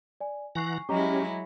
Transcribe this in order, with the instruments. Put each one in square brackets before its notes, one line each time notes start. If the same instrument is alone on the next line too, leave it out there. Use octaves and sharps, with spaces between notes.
[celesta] D5 G#5
[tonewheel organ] E3 F#5 A#5 [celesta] G#5 C#6 C7
[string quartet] F#3 G#3 E4 [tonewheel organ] C#4 G4 [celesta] D#5 A#5 D6